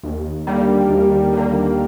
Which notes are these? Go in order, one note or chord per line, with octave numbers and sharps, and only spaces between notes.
D#2
D3 G3 A#3
D#2
D3 G3 A#3